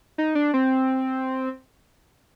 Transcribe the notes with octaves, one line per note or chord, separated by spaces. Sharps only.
D#4
D4
C4